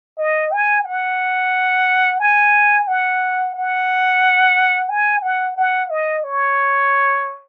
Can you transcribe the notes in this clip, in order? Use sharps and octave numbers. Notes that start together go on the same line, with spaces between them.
D#5
G#5
F#5
G#5
F#5
F#5
G#5
F#5
F#5
D#5
C#5